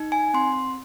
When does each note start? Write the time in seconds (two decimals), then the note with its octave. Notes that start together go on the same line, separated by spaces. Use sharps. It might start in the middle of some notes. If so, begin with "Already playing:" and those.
Already playing: D#4
0.12 G#5
0.34 C4 C6